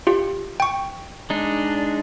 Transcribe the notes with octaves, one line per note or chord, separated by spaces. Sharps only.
F4 G4
G5 C#6
G#3 D4 D#4